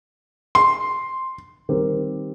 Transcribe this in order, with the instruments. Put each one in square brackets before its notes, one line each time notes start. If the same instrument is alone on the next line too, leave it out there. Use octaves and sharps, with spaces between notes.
[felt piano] C6
[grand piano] D#3 G3 C4 G4 A#4